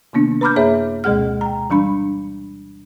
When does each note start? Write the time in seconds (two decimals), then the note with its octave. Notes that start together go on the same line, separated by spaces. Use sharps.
0.13 C3 D#3 A#3 B3 D4
0.41 B4 A#5 B5 D6 F6 G6
0.56 F#2 A#3 G#4 C#5 E5
1.04 D2 B2 G#3 G#4 F#5 F6
1.41 G5 A#5
1.70 E3 G3 D4 B5